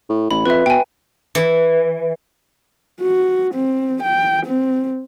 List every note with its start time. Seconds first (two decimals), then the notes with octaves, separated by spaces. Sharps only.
0.09 A2
0.31 A1 B5
0.46 F2 B4 E5
0.66 B2 G5 G#5
1.35 E3
3.01 F#4
3.54 C4
4.02 G5
4.46 C4